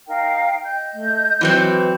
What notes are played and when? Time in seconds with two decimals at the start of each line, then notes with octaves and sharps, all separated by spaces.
0.07 D#4 A#4 F5 G5
0.63 D#5 G6
0.94 A3
1.41 E3 F#3 C4 B4